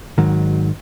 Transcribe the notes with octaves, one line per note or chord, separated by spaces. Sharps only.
G#1 G#2 D#3 F#3